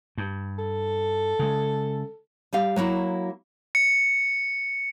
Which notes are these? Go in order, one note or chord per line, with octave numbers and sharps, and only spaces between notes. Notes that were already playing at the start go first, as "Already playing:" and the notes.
G2
A4
C#3 G#3
G3 G4 F5
F#3 A#3 E4 F#4
C#7